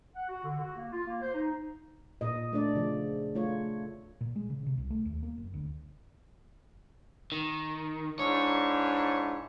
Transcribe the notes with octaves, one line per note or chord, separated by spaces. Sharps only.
F#5
F#4
D3
F#4
A#3
F4
A#3
C5
D#4
A#2 D#5
A3 D4 D5
C#3 F3
A3 F4 C#5
A#2
G#3
C#3
C3
C2
A3
D#2
A#3
F#1
D2
D#3
G#2 D4 E4 C#5